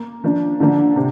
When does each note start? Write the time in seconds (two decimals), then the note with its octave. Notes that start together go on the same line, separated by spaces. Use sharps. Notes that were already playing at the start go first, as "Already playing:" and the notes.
Already playing: A#3
0.24 F3 A#3 D4
0.60 D3 F3 A#3 D4
0.96 C3